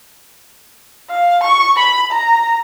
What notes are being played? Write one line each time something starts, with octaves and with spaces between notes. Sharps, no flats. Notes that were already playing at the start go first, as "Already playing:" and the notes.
F5
C#6
B5
A#5